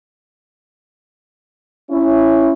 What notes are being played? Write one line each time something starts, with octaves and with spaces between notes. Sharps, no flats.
C#4 E4